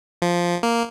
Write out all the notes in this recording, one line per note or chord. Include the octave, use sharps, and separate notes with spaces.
F3
A#3